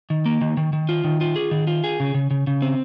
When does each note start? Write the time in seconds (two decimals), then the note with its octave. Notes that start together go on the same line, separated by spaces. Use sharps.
0.10 D#3
0.26 A#3
0.41 D#3
0.57 D#3
0.73 D#3
0.89 F4
1.04 D#3
1.21 F4
1.36 G#4
1.51 D#3
1.67 F4
1.84 G#4
2.00 C#3
2.14 C#3
2.31 C#3
2.47 C#3
2.62 C4